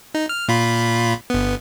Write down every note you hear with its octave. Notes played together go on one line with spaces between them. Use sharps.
D#4
F6
A#2 F4 B5
G1 B3